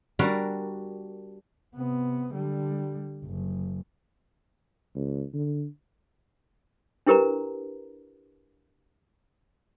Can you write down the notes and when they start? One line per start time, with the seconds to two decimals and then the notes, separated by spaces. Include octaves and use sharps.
0.19 G3 D4 F#4 A#4
1.75 C3 B3
2.33 D3 G3
3.25 F#1
4.96 C#2
5.33 D3
7.06 D4 E4 G4 A#4 B4 A#5